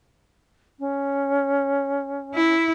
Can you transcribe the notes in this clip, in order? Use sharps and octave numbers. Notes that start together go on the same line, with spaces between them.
C#4
E4